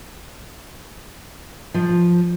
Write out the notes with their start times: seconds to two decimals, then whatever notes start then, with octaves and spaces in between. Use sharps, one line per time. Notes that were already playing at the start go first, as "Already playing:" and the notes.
1.74 F3